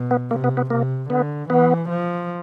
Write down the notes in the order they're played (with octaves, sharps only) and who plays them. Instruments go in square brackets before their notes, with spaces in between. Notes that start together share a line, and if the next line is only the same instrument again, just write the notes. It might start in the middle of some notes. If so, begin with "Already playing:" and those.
Already playing: [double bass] B2
[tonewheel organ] B3
[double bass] C3 [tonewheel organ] A#3
[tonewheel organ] B3
B3
[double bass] C3 [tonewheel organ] A#3
[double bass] D3 [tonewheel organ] B3
[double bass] E3 [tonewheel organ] B3
[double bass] F3